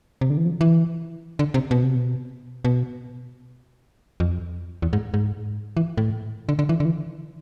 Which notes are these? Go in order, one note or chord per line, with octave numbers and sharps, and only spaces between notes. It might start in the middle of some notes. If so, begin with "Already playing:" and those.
C3
D3
E3
F3
E3
D3
C3
B2
C3
B2
B2
F2
E2
G#2
G#2
E3
A2
D3
D3
E3
D3
E3